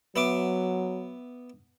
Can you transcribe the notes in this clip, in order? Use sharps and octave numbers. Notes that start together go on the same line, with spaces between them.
F#3 B3 E5 D6